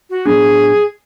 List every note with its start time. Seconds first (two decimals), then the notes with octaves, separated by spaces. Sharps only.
0.10 F#4
0.25 A2 F#3 B3 D4 G#4